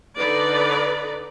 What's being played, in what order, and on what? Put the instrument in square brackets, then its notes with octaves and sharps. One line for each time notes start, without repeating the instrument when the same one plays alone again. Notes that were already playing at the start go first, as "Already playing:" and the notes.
[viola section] D3 D#4 B4 D5